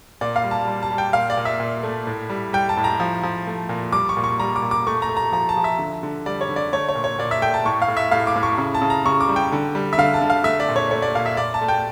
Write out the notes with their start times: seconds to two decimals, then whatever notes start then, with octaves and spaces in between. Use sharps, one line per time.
0.21 A#2 D5
0.36 F5
0.44 G3
0.51 A5
0.68 G3
0.83 A5
0.91 G3
0.98 G5
1.13 A#2 F5
1.30 D5
1.37 A#2
1.45 E5
1.60 A#2
1.83 A3
2.07 A2
2.30 G3
2.53 G3 G5
2.69 A5
2.77 A2
2.84 A#5
3.00 F3
3.23 F3
3.47 A3
3.69 A#2
3.92 G3 D6
4.09 C#6
4.17 A#2
4.24 C#6
4.39 G3 A#5
4.56 D6
4.62 A#2
4.71 D6
4.87 A3 C#6
5.02 A#5
5.09 A3
5.17 A#5
5.32 F3 A#5
5.49 A5
5.57 F3
5.64 E5
5.79 D3
6.03 D3
6.26 G3 D5
6.41 C#5
6.49 D3
6.56 D5
6.73 A3 C#5
6.89 C#5
6.95 A#2
7.04 C#5
7.19 A#2 D5
7.31 E5
7.42 A3 G5
7.54 A5
7.65 A2 C#6
7.82 F5
7.88 A2
7.97 E5
8.11 A2 F5
8.27 D6
8.36 A2
8.43 C#6
8.58 C#3
8.74 A5
8.82 C#3
8.90 A#5
9.06 C#3 C#6
9.21 D6
9.29 G3
9.36 G5
9.52 D3
9.75 G3
9.93 E5
9.98 D3 F5
10.14 A5
10.22 D3
10.30 F5
10.44 A3 E5
10.60 D5
10.69 A#2
10.76 C#5
10.91 A3 C#5
11.02 D5
11.15 A#2 F5
11.26 E5
11.37 A#2 D5
11.54 A5
11.62 A3
11.68 G5